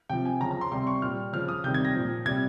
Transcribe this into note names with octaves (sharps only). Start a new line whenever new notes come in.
C3 F3 G5
G#5
C#3 F3 A#5
A#5
C6
C3 G3 C6
C#6
A#2 G3 F6
C#3 F3 F6
D#6
C3 D#3 G3 G6
G#6
A#6
A#2 F3
C3 G3 G#6